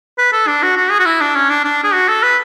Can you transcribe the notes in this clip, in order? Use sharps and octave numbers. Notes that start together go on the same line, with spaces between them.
B4
A4
D4
F#4
F#4
G#4
F#4
E4
D4
C#4
D4
D4
G#4
F#4
A4
B4